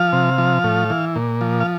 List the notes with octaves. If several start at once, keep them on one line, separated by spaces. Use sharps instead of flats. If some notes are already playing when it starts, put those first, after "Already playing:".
Already playing: F3 F5
C3
F3
A2
E3
A#2
F3
F5